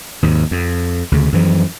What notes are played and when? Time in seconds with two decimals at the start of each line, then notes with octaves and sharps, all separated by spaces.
0.23 D#2 G#2
0.51 F2
1.12 D2 C#3
1.32 F#2 E3 F3